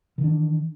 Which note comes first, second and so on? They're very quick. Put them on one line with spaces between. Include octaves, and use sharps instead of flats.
D#3 E3 D4